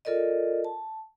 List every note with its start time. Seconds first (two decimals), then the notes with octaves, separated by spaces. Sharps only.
0.05 F4 A4 A#4 D5 D#5
0.64 A5